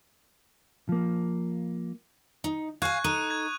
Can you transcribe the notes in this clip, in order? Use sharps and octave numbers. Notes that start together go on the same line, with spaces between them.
F3 A#3
D#4
F5 G#5 C#6 F#6 G#6
D#4 A4 D#6 F#6 D#7
G#6